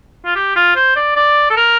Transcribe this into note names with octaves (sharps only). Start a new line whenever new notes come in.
F4
G4
F4
C5
D5
D5
A4
A#4